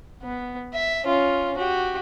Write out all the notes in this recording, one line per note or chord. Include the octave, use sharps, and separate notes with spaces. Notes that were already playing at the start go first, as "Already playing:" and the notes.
B3
E5
C#4 F4
F#4 G4